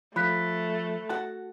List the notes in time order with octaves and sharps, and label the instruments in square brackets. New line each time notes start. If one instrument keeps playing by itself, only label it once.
[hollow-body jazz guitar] F3 [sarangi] A3 [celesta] B5 F#6 B6
[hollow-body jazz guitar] F#4 F#5 A5